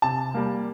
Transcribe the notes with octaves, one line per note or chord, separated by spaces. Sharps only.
C3 A5
G3 A#3